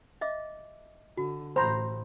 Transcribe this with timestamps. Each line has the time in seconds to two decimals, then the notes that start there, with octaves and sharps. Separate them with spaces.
0.21 D#5 E5 D6
1.17 D3 F#4
1.56 A1 C5 A#5 B5